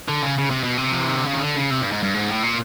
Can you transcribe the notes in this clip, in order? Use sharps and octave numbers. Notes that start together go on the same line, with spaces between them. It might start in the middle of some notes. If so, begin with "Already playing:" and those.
D3
C#3
C#3
C3
B2
C3
F3
E3
D#3
D3
C#3
D#3
D3
C#3
C3
G2
G#2
G2
G#2
A2
A#2